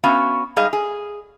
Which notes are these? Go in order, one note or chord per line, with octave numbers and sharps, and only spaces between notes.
B3 C#4 F#4 F5
G#2 G3 G#4 D#5 F5
G#4